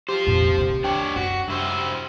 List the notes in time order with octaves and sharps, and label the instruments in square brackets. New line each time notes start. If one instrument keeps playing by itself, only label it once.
[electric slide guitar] F4 C5 [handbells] G4
[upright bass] F2 A#2
D#3 E3
[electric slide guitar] D4 C#5 [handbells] G5
[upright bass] F#2 [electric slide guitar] F#4
[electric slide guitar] G2 E4 C5